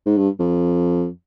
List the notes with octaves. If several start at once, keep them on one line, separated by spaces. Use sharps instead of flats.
G#2
G2
F2